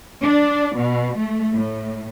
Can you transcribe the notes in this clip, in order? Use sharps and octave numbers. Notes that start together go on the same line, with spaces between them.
D4
B2
A3
A2